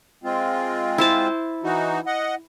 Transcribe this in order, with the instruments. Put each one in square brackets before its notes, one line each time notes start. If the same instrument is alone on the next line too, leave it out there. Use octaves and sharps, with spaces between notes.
[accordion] G#3 C4 F4
[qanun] E4 C5 A5
[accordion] E3 D#4 F#4
D#5 F#5